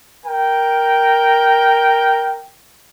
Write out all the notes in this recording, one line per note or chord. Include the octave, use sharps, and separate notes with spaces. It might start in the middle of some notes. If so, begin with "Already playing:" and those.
A#4 G5